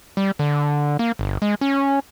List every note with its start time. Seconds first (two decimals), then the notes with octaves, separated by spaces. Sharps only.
0.17 G3
0.39 D3
0.99 A#3
1.19 G1
1.42 G#3
1.61 C#4